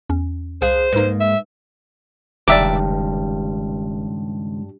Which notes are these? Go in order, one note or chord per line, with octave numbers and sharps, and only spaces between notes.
E2 C#4
C2 G#4 C5 F5 F#6
G#2 A#3 D#4 B4
E5
F1 C#2 G2 D#3 D5 E5 A#5 D6